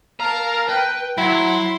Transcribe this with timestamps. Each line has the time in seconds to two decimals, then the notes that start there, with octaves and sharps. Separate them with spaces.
0.20 A#4 F5 A5 A#5
0.69 B4 G5
1.18 F#3 E4 C6